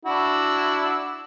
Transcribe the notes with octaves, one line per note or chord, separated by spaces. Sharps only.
D4 E4 F#4